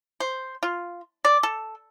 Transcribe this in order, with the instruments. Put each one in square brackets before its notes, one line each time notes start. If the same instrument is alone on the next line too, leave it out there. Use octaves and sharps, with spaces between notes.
[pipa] C5
F4
D5
A4